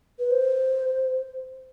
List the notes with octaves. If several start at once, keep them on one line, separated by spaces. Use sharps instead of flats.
B4
C5